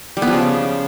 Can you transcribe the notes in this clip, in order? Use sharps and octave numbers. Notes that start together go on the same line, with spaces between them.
G3
B3
F3
C#3